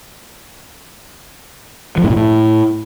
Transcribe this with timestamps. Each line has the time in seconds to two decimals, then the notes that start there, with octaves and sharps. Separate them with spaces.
1.98 F3
2.04 G#2
2.10 A#2
2.16 A2